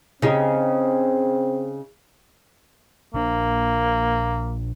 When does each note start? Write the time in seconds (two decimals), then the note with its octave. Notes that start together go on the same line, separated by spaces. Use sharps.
0.22 C#3 C4 D#4 G4
3.14 A#1 A#3 D4